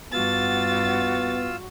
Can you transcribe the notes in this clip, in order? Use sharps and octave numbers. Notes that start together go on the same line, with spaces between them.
G2 B3 F4 F#4 E6 A6